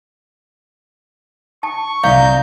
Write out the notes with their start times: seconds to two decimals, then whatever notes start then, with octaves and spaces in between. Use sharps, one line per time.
1.63 A5 C#6
2.04 C2 F5 A#5 G6